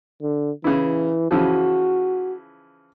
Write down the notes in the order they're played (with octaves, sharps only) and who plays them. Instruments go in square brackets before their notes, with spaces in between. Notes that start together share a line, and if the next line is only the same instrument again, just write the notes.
[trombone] D3
[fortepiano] C#3 E4 [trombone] E3
[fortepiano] C#3 E3 F3 [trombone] F#4